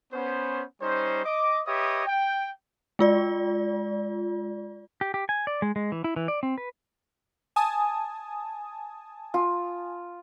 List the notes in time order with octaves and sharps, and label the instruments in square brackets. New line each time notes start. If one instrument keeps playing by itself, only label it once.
[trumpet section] B3 C#4 C5
G3 C#4 D#4 C5
D#5 D6
G4 B4 C#5 D#5 E5 D#6
G5
[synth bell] G#3 F4 D5
[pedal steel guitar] G4
G4
G#5
D5
G#3
G#3
E3
E4
E3
D5
C4
B4
[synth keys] G#5 A5 D#6
[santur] F4